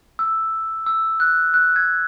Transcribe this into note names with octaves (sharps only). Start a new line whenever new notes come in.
E6
E6
F#6
F#6
G#6